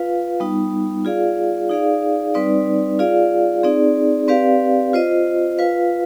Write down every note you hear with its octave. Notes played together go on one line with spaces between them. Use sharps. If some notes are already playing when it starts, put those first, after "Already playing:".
Already playing: F4 B4 F5
G3 B3 D#4
F4 G#4 D5 F5
D#4 G#4 D5 F5
G3 C4 D#4 B4 D5
F4 G#4 D5 F5
C4 D#4 G#4 D5
C4 G4 B4 D5 F5
F4 C5 D#5
F4 B4 F5